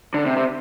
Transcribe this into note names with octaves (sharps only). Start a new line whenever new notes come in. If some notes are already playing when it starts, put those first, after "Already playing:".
D3
C3
C3